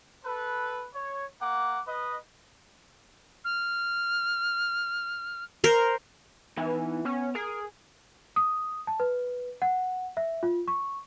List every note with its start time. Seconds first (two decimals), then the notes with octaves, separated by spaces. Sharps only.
0.24 A4 B4
0.93 C#5
1.41 A#3 F#5 D6
1.87 B4 D#5
3.45 F6
5.64 A#4 C5
6.57 E3 B3 D#4 G#5
7.05 B3 C#4
7.35 G#4 A#4
8.36 D#6
8.87 A5
9.00 B4
9.62 F#5
10.17 E5
10.43 F4
10.68 C#6